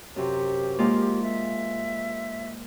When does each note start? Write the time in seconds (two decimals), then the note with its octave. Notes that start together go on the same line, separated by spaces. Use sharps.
0.16 F#2 C3 G4
0.79 G#3 A#3 F4
1.22 E5